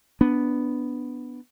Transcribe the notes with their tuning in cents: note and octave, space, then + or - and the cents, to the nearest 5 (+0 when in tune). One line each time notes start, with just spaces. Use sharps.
B3 +0 D4 -5